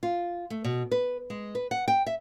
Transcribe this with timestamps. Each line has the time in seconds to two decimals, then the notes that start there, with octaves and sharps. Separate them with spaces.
0.03 F4
0.50 A3
0.64 B2
0.91 B4
1.30 G#3
1.55 B4
1.71 F#5
1.88 G5
2.07 E5